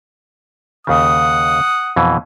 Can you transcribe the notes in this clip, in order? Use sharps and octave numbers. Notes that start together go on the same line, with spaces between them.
D#2 C#3 F#5 D#6
F2 B2 E3